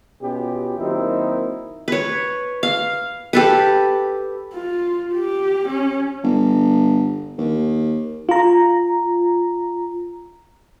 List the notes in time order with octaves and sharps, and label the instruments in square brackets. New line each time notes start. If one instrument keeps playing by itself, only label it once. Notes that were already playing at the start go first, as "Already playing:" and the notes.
[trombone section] B2 C#4 F4 G4
D#3 F#3 A#3 C4 D#4 E4
[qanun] B4 C#5
F5
G4 A4 B4
[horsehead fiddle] F4
G4
C#4
[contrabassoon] G1
D#2
[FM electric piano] F4 A#5